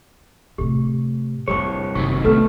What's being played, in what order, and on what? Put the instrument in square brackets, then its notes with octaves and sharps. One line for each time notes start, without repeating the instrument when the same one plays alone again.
[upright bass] A2 C3 [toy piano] G4
[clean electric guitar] C2 C#5 [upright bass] F2 D3 [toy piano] G4 C#6
[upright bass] F#1 [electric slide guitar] C3 D#3 F#3 [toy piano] C#6
[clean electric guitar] A3 [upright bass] B3 D4 [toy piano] A4 B4